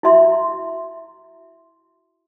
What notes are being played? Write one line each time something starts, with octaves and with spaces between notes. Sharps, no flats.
E4 F#4 E5 C6